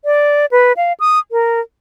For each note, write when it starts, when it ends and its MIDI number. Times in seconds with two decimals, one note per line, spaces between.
0.05 0.46 74
0.51 0.73 71
0.77 0.93 77
1.00 1.19 87
1.32 1.60 70